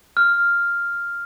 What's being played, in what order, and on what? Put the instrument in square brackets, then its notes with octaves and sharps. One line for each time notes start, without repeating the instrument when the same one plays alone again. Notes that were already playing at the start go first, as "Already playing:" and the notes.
[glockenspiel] F6